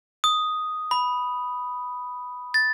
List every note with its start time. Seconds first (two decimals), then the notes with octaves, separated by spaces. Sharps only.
0.24 D#6
0.91 B5
2.54 A6